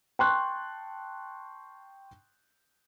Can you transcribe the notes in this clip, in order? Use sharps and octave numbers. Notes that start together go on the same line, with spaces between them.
G5 A5 C6 C#6 F#6